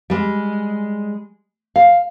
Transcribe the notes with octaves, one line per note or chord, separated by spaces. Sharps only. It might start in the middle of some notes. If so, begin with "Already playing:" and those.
G3 G#3
F5